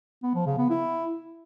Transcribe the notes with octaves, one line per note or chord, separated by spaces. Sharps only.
B3
F3
C#3
B3
E4